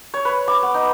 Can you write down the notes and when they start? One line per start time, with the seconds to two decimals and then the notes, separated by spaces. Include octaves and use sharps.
0.14 C#5
0.25 B4
0.48 D6
0.63 B3
0.74 D#4